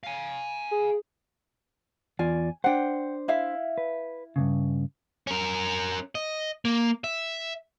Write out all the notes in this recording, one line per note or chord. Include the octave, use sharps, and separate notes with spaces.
F5 G#5
G#4
E2 F4 D5 G#5
D4 C5 F#5 G5
E4 E5 F5
B4
G2 A#2 C#3
C#4 A#4
D#5
A#3
E5